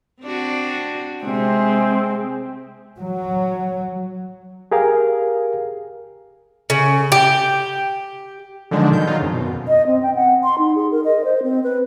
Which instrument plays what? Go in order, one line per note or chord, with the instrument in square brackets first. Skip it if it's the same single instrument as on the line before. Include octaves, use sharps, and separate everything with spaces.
[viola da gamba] C4 D4 F#4
[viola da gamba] C3 [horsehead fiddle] G#3 C4
[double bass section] F#3
[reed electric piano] G4 G#4 A#4 F5
[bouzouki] C#3
G4
[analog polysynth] D3 D#3 F3 F#3 G#3 D4
B2 D#3 G6
D#3 F#3 D#4 F4
F2 C#3
F#2 B2
[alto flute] D#5
C4
G5
F#5
C6
D#4
G#4
A#4
D#5
C5
C4
B4